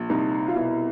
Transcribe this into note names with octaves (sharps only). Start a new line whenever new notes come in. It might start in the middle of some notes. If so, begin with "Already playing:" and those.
Already playing: A#1
C2 D#4
F4
B2 E4